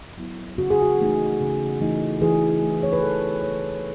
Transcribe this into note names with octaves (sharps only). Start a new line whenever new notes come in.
F#3 B3 E4
C#3 F#4
G#4
F#4
E3 A3 D#4
C#3
E3 A3 D#4
E3 G#4
A3 E4
C#5
B4
E3 A4
A3 E4 C#5